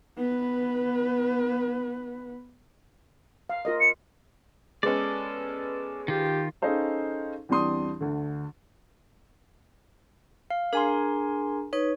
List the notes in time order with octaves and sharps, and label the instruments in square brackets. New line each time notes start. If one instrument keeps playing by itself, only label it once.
[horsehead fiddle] B3 B4
[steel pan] F5
F4 A#4 D#5
[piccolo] C#7
[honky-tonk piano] G#3 B3 C#4 [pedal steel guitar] A4 D5
[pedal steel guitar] D#3 F4 [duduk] G4
[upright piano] C#4 D#4 G#4 A4 C5 F5
E2 G3 C4 D4 C6 D#6
D2 D3
[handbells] F5
[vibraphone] D4 G#4 A#5 [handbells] A#4 G#5 C6
[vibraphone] D#4 B4 [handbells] C#5